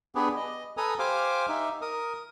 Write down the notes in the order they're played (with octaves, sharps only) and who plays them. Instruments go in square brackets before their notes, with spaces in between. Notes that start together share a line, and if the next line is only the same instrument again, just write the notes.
[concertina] B3 D4 G4 G#4 B4
D#5
A4 B4 G#5 A#5 D#6
G4 C5 F5 G#5 D6
D#4 E5
A#4 D#6